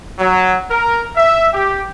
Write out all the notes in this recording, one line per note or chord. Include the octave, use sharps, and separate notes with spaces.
F#3
A#4
E5
G4